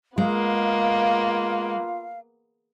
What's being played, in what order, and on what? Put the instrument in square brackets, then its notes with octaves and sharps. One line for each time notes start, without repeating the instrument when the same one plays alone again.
[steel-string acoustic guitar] G#3 [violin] A#3 B3 [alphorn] F4 [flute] F5